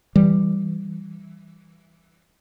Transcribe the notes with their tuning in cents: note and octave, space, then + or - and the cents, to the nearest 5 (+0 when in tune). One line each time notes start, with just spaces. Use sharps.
E3 +0 G3 +5